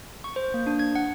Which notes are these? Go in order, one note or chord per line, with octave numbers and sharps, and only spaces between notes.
C#6
C5
A#3
D4
G#6
F#5